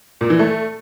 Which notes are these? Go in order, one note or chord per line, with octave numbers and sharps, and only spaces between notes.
A#2
E3
A3